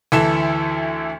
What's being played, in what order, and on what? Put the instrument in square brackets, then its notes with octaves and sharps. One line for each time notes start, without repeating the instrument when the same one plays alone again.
[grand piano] D2 E3 A4 E5 E7